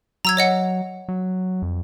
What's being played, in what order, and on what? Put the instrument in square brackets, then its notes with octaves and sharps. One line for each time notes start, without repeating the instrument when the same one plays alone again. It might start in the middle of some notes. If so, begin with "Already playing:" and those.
[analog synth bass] F#3 [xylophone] A#5 E6 G#6
[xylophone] C#5 D#5 F#5
[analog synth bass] F#3
F2